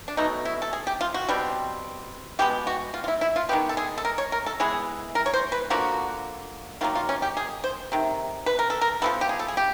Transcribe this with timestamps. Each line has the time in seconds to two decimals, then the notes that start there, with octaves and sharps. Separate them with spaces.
0.08 D4
0.17 B2 F#3 A3 D#4
0.45 E4
0.62 A4
0.73 G#4
0.87 G4
1.01 F4
1.14 F#4
1.29 B2 G3 C4
2.39 B2 G#3 B3 G4
2.67 F#4
2.94 F4
3.04 F4
3.08 E4
3.21 E4
3.36 F4
3.49 D#3 G#3 B3 G4
3.69 A4
3.77 G#4
3.98 A4
4.05 A#4
4.18 C#5
4.32 A#4
4.46 A4
4.60 E3 G#3 B3 G#4
5.15 A#4
5.26 C#5
5.34 C5
5.52 B4
5.70 D3 F3 A#3 F#4
6.81 D#3 F#3 A#3 F4
6.95 F4
7.09 C#4
7.22 G4
7.37 G#4
7.64 C5
7.92 C3 D#3
8.46 B4
8.59 A#4
8.70 A4
8.81 A#4
9.02 F3 G#3 B3 A4
9.21 G4
9.29 G#4
9.39 A4
9.48 G#4
9.57 G4